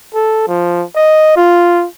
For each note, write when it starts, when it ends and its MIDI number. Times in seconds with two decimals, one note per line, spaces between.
0.14 0.47 69
0.48 0.85 53
0.96 1.33 75
1.36 1.87 65